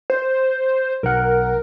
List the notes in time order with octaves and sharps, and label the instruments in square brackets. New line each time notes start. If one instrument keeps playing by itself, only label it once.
[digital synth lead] C5
[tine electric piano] B1 F#5 [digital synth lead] A#4